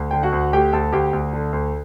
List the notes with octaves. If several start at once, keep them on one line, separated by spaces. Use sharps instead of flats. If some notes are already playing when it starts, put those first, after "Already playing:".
Already playing: D2
D3 G5
F#4 F#5
D2
A3 G4 G5
D2 A4 A5
D2 G4 G5
D2
D3
D2